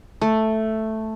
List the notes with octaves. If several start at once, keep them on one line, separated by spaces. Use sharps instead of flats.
A3